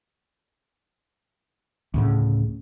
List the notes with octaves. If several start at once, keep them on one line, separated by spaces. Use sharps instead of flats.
D2 A2 C#3